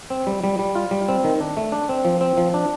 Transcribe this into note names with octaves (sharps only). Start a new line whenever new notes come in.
C4
G3
G3
G3
F4
G3
C4
D#3
D4
A3
D4
C4
F3
C4
F3
D4